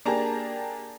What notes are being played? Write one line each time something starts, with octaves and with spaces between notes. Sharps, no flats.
A#3 D4 G4 G#4 A5 A#5